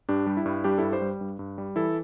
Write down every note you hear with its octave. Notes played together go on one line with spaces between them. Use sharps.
G2 D4 G4
G3
E4
G2
G3 D4 G4
G2 E4 A4
G4 C5
G3
G2
G2
G3
E3 E4 A4